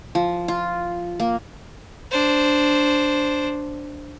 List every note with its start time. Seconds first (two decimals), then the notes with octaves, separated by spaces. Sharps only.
0.15 F3
0.48 F4
1.20 A#3
2.11 D4 C5